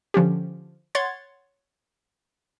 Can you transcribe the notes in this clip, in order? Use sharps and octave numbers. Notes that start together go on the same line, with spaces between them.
D3 F3 C#4 G4
C#5 F#5 C6 G#6 A6